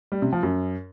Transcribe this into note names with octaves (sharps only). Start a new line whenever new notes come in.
G3
C3
F3
F#2